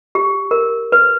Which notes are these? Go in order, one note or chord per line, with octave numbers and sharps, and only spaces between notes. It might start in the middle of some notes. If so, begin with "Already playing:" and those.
G4
A#4
B4